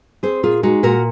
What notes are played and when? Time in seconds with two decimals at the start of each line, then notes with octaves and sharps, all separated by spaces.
0.23 C4 G#4 C5
0.43 A#2 F4 G#4
0.63 G#3 D#4 F#4
0.83 A#2 F#4 A#4